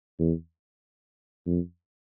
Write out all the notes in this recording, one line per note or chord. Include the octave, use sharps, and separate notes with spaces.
E2
F2